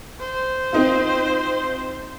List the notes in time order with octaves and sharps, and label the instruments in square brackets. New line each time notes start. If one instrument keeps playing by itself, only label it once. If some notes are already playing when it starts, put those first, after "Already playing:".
[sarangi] C5
[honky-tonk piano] C4 D#4 F4